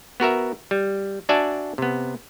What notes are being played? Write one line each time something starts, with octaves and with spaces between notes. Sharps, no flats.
B3 F#4 A#4 E5
G3
D4 F#4 D5 E5 G#5 A5
C3 B3